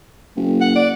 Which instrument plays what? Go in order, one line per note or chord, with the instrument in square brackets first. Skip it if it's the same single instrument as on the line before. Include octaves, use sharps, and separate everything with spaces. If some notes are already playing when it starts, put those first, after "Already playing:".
[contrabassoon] F#1
[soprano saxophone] F#5
D5